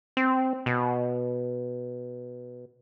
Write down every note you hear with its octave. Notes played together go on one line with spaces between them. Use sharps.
C4
B2